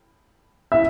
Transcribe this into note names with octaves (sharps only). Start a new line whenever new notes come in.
E5